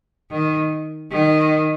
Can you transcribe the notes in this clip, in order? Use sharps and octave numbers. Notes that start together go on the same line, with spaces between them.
D#3
D#3